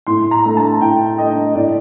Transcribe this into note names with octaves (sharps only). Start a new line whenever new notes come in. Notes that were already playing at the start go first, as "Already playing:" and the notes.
A2 C6
A#5
A3 D4
A5
A2 G5
A3 D4 D#5
A2 D5